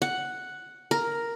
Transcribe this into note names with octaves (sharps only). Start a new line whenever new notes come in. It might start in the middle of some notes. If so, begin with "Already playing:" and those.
F#5
A#4